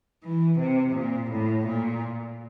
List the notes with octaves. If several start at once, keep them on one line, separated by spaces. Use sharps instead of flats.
E3
C3
A#2
A2
A#2